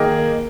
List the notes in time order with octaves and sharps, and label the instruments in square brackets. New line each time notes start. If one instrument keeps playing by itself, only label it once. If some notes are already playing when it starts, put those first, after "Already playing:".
Already playing: [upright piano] D#3 A#3 D#4 G#4